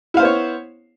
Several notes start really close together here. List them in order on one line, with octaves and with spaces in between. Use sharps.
E4 F5 C5 B3 C#5